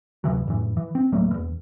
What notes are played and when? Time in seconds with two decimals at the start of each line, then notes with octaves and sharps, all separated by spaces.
0.24 D2 C3 E3 F#3
0.47 F2 A2 E3
0.77 E3
0.95 C4
1.12 D1 F#3 A3 A#3
1.31 E1 E2